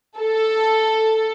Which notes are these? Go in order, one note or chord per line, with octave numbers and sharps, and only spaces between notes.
A4